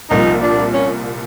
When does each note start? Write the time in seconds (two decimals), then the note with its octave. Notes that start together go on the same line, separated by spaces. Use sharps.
0.10 C2 A#2 F3 D#4
0.42 D4
0.74 C#4